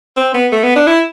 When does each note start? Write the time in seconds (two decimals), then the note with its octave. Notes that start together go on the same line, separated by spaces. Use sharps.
0.17 C4
0.34 B3
0.52 A3
0.63 B3
0.76 D4
0.87 E4